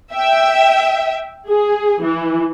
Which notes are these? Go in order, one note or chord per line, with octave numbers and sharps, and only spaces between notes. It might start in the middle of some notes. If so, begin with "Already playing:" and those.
E5 G5
G#4
E3